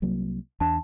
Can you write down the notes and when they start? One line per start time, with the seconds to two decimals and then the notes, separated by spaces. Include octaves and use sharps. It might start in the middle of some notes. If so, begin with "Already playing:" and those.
0.02 C2 F#3 A#3
0.60 E2 D4 A5